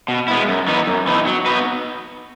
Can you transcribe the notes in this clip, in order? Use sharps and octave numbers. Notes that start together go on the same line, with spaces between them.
B2
G#3 B3 E4
F#2
E3 B3 D#4
F#2
E3 B3 D#4
F#3
B3 D#4 F#4 B4